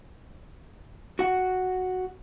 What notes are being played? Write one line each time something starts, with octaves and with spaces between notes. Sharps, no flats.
F#4 F#5